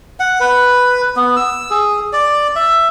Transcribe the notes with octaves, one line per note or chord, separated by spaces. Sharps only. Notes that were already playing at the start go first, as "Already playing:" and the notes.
F#5
B4
B3
E6
G#4
D5
E5